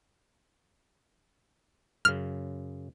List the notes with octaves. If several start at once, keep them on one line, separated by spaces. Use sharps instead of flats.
F#2 C#3 F6